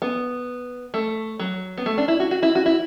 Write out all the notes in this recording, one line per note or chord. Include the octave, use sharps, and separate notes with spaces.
B3
A3
F#3
B3
A3
D4
E4
F#4
F#4
E4
F#4
E4